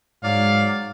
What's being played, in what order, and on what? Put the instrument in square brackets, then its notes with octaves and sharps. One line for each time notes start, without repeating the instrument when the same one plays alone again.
[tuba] G#2 [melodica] F#3 D5 [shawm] F5